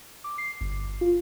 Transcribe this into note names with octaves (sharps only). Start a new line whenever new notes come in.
D6
C7
G1
F4